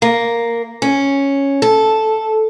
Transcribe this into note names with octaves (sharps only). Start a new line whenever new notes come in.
A#3
C#4
A4